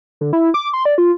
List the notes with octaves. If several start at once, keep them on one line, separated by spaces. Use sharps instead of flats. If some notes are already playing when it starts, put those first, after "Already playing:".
D3
E4
D6
C6
D5
F4